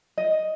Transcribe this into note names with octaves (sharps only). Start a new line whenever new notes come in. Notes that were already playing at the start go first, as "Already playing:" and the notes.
D#5